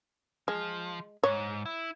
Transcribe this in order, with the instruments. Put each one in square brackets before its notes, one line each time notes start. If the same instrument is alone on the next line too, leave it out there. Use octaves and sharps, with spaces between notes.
[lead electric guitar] F3 [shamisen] G#3
[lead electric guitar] G#2 [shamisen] C#5
[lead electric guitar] E4